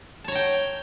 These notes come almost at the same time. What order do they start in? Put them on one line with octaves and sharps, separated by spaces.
A5 C#5 A#5 G5